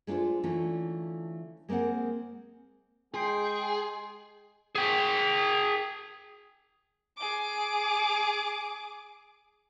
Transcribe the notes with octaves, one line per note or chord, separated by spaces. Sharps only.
G#3 A3 D4 F4 C5
D3 E3 A3 C#4 F4
G#3 A#3 C4 A#4 F#5
G#3 G#4 G5 G#5 C6 C7
G#4 G5
G#4 D6